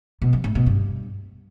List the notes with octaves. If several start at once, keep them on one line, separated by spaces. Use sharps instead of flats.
B2
F3
A2
B2
G2